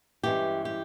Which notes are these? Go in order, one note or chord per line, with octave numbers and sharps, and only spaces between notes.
G2 E3 G#3 C#4 G4
G4